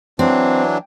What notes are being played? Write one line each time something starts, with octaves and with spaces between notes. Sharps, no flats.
E3 F#3 C4 D4